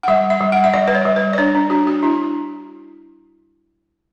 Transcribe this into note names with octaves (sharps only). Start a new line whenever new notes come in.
F#5
G3 E5
E5
G3
F#5
E5
G3 D5
B4
C#5
G3
B4
D5
D4 C#5
D4
D4 F#4
F#4
D4 E4